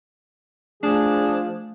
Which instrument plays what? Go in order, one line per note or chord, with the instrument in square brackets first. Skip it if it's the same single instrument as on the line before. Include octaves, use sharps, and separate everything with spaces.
[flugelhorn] F3 [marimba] A3 [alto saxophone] D4 [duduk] G#4